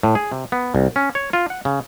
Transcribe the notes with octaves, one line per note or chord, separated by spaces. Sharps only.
A2
G#4
C3
B3
C2
C#4
C#5
F4
F#5
C#3